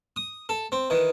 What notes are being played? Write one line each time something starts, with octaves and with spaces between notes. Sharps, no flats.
D#6
A4
C4
D#3 E3